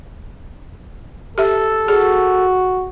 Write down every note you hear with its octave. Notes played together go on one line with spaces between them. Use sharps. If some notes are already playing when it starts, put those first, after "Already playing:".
G4 A4 E5
F#4 G#4